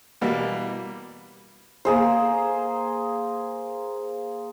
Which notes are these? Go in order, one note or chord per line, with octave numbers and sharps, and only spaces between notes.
B2 E3 G3 A#3
A#3 G#4 C5